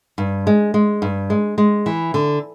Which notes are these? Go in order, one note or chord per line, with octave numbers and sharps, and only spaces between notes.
G2
G#3
G#3
G2
G#3
G#3
E3
D3